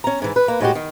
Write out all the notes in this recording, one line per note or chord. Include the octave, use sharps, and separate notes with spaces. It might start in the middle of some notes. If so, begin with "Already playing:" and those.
C#4 A#5
G#2 E3
B4
A#3
A2 G#3 F#4 G4
D#3